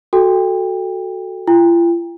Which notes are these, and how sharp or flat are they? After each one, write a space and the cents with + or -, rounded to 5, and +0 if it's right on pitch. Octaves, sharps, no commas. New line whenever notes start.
F#4 +5 A4 +0 G5 +25
F4 -45 G5 +30